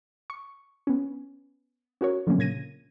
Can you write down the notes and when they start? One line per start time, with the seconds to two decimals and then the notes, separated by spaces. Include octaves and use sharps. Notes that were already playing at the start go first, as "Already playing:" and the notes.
0.30 C#6
0.87 B3 C#4
2.01 C#4 F#4 A#4 C#5
2.27 D3 F3 F#3 A#3 C#4
2.38 A#2 C#3 G#6 A#6 D#7